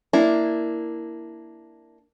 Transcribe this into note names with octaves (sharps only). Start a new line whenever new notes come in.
A#3 D4 E4